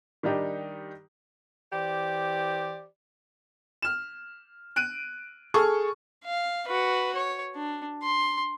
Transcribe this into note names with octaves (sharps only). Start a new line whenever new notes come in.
D#3 G3 D4 D#4 G4
E3 G4 C5 D5
F6 E7
F#6 D7 D#7
G#4 A4 C#6 F6
F5
F#4 B4
C#5
D4
C6